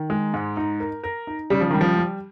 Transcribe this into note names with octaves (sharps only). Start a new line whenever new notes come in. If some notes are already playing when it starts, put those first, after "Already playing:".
Already playing: D#3
G#3
G#2
D#4
A#4
A#4
D#4
C#3 G3
F3
D#3 G3
F3
G3